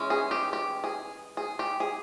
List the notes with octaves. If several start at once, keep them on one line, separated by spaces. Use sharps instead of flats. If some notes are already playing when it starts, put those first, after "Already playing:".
Already playing: E3 G#3 C#4
G#4
G4
G4
G#4
G#4
G4
G#4